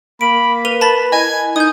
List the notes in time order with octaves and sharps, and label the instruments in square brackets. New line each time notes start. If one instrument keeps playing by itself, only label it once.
[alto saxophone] A#3 [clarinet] B5 [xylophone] D7
[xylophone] A#4 D#7 F7 [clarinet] B4
[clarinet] B4 [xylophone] A5 B5 A6
[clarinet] E4 [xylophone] D#5 [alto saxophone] G#5
[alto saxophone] D#4 [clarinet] G#5 [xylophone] D#6 G6